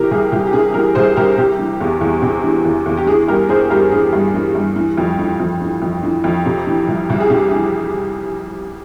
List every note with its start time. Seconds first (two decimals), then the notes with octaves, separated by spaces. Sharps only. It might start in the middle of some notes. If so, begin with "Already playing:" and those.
Already playing: C3 E3 G4 A#4
0.11 C2 G#4
0.32 C2 G4
0.47 G4
0.53 C3 G#4
0.74 E3 G4 A#4
0.95 C2 G#4 C5
1.16 C2 G4 A#4
1.38 C3 G4
1.59 E3
1.80 E2
2.01 E2
2.22 C3
2.44 E3
2.65 E2
2.86 E2
2.97 G4
3.07 E3 G#4
3.28 G2 G4 A#4
3.49 E3 G#4 C5
3.70 G2 G4 A#4
3.91 E3 G#4
4.13 G2
4.34 E3
4.55 G2
4.76 E3
4.98 F2
5.19 E3
5.40 F2
5.62 E3
5.82 F2
6.03 E3
6.24 F2
6.46 C3
6.67 E3
6.88 C2
7.10 C2
7.20 G#4
7.30 C3 G4
7.51 E3